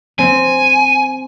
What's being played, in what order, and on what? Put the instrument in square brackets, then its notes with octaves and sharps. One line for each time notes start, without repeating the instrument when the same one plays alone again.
[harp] C4 [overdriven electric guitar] G#5